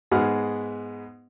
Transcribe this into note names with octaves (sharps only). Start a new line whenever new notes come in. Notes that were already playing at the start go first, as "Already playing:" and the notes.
G#2 G#3 B3 F#5 F6